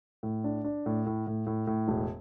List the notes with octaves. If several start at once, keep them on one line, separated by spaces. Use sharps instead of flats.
A2
D4
D4
A2
A2
A2
A2
A2
E1